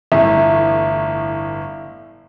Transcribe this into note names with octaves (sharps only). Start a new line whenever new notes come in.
G1 A2 E3 E5